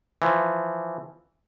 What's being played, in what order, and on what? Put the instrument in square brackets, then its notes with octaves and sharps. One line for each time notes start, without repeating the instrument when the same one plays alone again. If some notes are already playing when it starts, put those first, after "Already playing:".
[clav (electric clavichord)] E3 F3